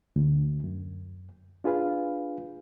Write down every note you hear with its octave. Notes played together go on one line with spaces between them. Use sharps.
D2
F#2
D4 F4 G#4 B4 F5